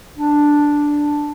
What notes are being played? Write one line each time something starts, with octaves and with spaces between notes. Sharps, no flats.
D4